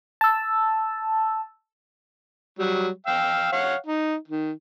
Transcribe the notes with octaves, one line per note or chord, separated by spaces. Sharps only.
A5 E6
F#3 G3
F5 G5 E6
C#5 F5 F#5
D#4
D#3